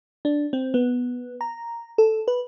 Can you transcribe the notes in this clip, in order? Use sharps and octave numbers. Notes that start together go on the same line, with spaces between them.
D4
C4
B3
A#5
A4
B4